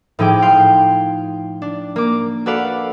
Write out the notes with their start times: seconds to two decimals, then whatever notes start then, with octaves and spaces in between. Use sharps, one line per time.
0.19 A2 F3 D#4 G#4 G5 D6
0.42 F5 G5 C6
1.62 D4
1.96 A#3 D6
2.46 F#4 A4 B4 D5 F5 F#5